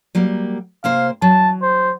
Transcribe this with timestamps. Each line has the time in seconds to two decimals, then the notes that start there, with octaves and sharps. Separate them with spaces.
0.15 F#3 G3 A#3
0.84 C3 A#3 C5 F5
1.22 F#3 A5
1.62 C5